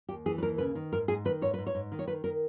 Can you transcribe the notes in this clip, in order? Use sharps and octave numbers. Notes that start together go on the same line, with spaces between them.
D#2 G4
E3 G#4
B4
D#2 A#4
C#3 B4
D#3
G#2 A#4
G#2 G#4
D#3 B4
G#2 C#5
G#2 B4
C#5
G#2
D#3
C#5
D#3 B4
D#3 A#4